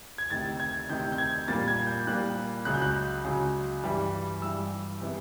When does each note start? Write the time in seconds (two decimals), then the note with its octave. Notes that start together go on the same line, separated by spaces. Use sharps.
0.18 G#6
0.30 D2 C3 D#3 A6
0.60 G#6
0.89 D2 C3 D#3 G6
1.12 G6
1.18 G#6
1.48 A#2 G3 A#3 A6
1.68 G#6
1.87 G6
2.07 A#2 G3 A#3 F#6
2.65 C#2 C#3 F#3 F#6
2.74 G6
2.82 F#6
3.25 C#2 C#3 F#3
3.84 G2 E3 G3
4.42 G2 E3 G3 E6
5.01 C3 E3 G#3 B3